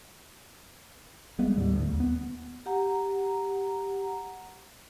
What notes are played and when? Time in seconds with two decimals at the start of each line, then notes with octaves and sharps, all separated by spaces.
1.39 G3 G#3 B3
1.56 D#2 A2 G3
1.72 D2 A2
1.89 D#2
2.00 B3
2.66 G4 F#5 A#5